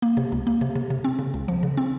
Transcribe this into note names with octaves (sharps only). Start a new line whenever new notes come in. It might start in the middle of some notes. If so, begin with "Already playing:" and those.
A#3
C3
C#2
A#3
C3
C3
C3
C4
C#3
C#2
F3
C#3
C4